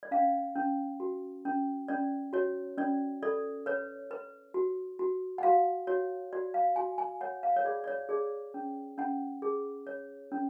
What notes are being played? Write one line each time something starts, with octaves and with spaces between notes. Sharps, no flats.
D5
C#4 F5
C#4
F#4
C#4
C#4 D5
F#4 C#5
C#4 D5
A4 D5
B4 C#5
B4
F#4
F#4
F#5
F#4 F5
F#4 C#5
F#4 D5
F5
F#4 G#5
G#5
C#5 F#5
F5
C#5
G#4 D5
D5
C#5
G#4 D5
C#4
C#4 F#5
G#4
C#5
C#4